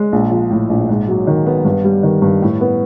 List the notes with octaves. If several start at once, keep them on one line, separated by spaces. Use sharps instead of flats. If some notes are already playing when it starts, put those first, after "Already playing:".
Already playing: G#3
A#1
F3
A2
A#1
G#2
F#3
D#3
B3
G2
G3
D#3
G2
A2
B3